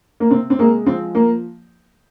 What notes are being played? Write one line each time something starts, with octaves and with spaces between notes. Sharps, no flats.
A#3
C3 C4
C4
G#3 A#3
F3 C4
A#3